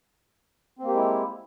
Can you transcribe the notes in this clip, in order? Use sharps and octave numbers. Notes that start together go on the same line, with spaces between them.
G#3 A#3 C4 E4 G4